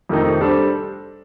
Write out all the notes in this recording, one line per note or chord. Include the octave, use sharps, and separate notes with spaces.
F2 C3 D#3 A3 D#4
G3 D4 A4 C5